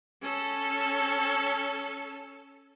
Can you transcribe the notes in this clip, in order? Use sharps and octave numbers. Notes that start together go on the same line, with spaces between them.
C#4 A4